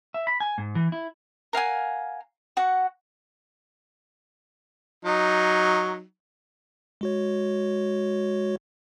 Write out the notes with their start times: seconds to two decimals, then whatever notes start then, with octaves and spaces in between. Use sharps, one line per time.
0.14 E5
0.27 B5
0.40 G#5
0.58 G#2
0.75 E3
0.92 E4
1.53 A#4 F5 F#5 G#5
2.57 F#4 F#5
5.05 F#3 D#4
7.01 G#3 F#4 C#5